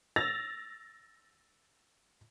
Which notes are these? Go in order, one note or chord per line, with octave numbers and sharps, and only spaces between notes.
E6 A6 A#6 F7